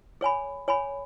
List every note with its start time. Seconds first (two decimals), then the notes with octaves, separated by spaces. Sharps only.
0.21 G#4 C#5 G#5 B5
0.68 G#4 C#5 G#5 B5